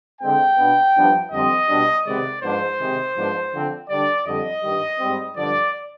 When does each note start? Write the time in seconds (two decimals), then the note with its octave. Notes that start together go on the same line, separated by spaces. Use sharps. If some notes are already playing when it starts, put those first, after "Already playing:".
0.20 D3 G#3 C4 G5
0.57 B2 B3 D4
0.95 G2 F3 B3 D4
1.31 F2 D3 G3 C4 D#5
1.69 B2 G3 D4
2.05 C3 D#3 G#3 B3 D5
2.42 G#2 F3 B3 D4 C5
2.79 C3 D#3 G#3
3.16 G#2 F3 B3 D4
3.53 D3 F3 C4
3.89 D3 G3 D4 D5
4.26 F2 D3 G3 D#5
4.64 G2 D#3 G3
5.00 G#2 G3 C4
5.36 G2 D3 F3 D5